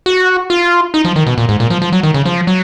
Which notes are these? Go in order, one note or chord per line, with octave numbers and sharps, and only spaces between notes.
F#4
F4
D#4
F3
D#3
B2
A#2
G#2
A#2
F3
F3
F#3
D#3
C#3
F3
F#3